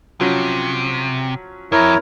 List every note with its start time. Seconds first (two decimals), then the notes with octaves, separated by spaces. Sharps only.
0.21 C3 F3 F#3 C#4
1.72 F2 E4 A#4 C#5